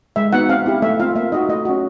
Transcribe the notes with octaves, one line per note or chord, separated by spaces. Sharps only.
G#3 E5
B3 D#4 F#4 F#5
C4 F5
E4 G4
A3 E5
C4 F4 F5
A#3 E5
D#4 F#4 D#5
A3 D#5
C#4 F#4